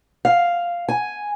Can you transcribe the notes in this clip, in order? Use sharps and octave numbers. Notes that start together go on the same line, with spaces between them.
F5
G#5